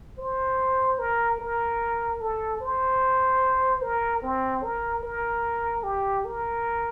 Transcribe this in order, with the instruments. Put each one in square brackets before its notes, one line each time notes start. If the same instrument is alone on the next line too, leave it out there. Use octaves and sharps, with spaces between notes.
[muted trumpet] C5
A#4
A#4
A4
C5
A#4
C4
A#4
A#4
G4
A#4